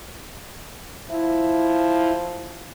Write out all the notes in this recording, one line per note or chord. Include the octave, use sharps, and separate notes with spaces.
F3 E4